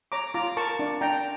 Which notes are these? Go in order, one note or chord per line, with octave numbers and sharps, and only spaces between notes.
C#5 A#5 D6
F4 A#5 D6
A#4 A5 C#6
D4
D4 G5 A#5